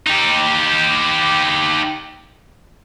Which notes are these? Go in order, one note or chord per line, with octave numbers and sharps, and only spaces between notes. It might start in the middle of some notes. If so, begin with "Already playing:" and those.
D#4 G4